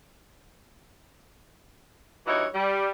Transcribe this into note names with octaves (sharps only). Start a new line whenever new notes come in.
G2 E3 D#4 E4 F#4 C#5
G3